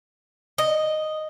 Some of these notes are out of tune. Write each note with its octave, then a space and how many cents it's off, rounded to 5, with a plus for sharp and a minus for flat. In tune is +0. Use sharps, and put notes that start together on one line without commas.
D#5 -5